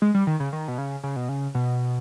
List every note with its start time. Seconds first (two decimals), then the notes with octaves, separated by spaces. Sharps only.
0.02 G#3
0.14 G3
0.27 D#3
0.40 C#3
0.53 D#3
0.68 B2
0.78 C#3
1.03 C#3
1.16 B2
1.29 C#3
1.55 B2